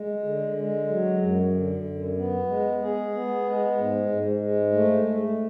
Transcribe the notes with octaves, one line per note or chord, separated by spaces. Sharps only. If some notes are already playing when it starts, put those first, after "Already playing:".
Already playing: G#3
D3
G#3
F#3
F#2
D3
F#2
B3
G#3
G#4
B3
G#3
G#2
G#2
G#3
A3
A3